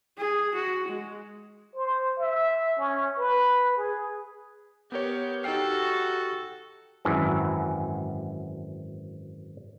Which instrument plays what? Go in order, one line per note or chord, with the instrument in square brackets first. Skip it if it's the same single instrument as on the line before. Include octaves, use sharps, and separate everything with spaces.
[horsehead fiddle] G#4
F#4
G#3
[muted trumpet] C5
E5
C#4
B4
G#4
[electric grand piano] B3 A#4 C#5 [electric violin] G4
[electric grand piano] D#4 C7 [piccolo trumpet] F#4 [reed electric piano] G4 G5 F6 [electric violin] A4
[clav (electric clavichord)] G#1 F#2 E3